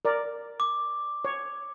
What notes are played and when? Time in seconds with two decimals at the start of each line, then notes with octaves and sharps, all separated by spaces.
0.05 A#4 D5
0.60 D6
1.25 C#5